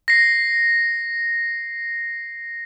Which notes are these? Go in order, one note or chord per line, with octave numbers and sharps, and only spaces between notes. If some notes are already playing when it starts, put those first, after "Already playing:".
A#6 C7